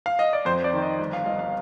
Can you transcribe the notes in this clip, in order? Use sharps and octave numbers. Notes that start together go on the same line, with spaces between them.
F5
D#5
D5
F2 C5
D5
D#3
D#5
G1
F5
G1 D#5
F5